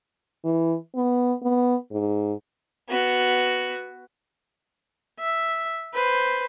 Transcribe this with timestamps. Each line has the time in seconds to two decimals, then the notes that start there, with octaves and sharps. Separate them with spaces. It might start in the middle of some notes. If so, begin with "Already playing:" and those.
0.44 E3
0.95 B3
1.42 B3
1.91 G#2
2.89 B3 F#4
5.20 E5
5.94 B4 C5